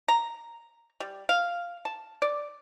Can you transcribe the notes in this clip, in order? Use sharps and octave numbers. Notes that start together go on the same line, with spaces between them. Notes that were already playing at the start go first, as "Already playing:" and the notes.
A#5
G3
F5
A5
D5